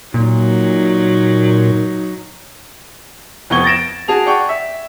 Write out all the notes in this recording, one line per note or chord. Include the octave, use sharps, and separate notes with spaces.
A#2 F#3 D#4
F1 F2 B3 C#6 G#6 G7
A6 A#6 D7 E7
F#4 G#4 A5 F7
D5 F#5 G5 C#6
E5